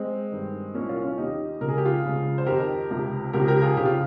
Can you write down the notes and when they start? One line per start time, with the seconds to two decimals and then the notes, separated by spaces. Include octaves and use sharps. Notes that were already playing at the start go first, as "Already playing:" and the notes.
Already playing: G#3 C4
0.32 G2 D#3
0.74 C2 A#2 F3 A#3 C#4
0.89 C#4 F4
1.03 C#4 F4
1.18 D#2 D#3 D#4 G4
1.60 C#2 C#3 F3 A#4
1.69 G#4
1.78 G4
1.85 F4 G#4
2.04 C#2 C#3 F3
2.38 C5
2.47 F2 D#3 G4 A#4
2.91 C#2 C3 F3
3.33 C#2 C#3 F3 G4 A#4
3.47 G4 A#4
3.62 F4 G#4
3.77 F2 C#3 F3 G4
3.86 F4